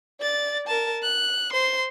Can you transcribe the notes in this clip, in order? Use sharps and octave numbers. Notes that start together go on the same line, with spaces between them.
D5 A6
A#4 A5
F#6
C5 C6